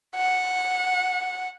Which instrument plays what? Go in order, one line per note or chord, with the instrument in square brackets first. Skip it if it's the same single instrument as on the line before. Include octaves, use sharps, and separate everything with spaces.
[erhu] F#5